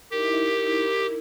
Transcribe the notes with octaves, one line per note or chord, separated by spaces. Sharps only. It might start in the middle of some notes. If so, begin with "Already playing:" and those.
D#4 E4 G4 A#4